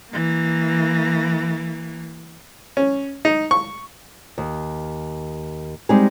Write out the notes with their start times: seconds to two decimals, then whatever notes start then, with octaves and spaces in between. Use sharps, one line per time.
0.10 E3 A#3
2.77 C#4
3.25 D#4
3.51 C#6
4.38 D#2
5.89 G3 G#3 C4 D#4 G4 G#4